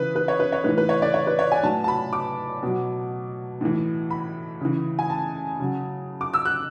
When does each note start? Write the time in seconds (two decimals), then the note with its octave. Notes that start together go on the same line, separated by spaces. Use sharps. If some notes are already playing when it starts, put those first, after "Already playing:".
Already playing: C#3 E3 B4
0.16 B4
0.28 C#5
0.40 B4
0.52 C#5
0.64 A2 E3 B4
0.78 B4
0.89 C#5
1.02 D5
1.14 C#5
1.27 B4
1.39 C#5
1.52 G#5
1.63 A2 F#3 A5
1.84 A5
1.88 B5
2.13 D6
2.62 B2 F#3
3.61 A2 E3
4.10 B5
4.60 C#3 E3
4.99 G#5
5.10 A5
5.60 C#3 F#3
6.21 D6
6.34 E6
6.45 F#6